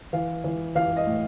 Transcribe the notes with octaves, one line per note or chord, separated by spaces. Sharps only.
E3 F5
E3
E3 F5
D#5
A2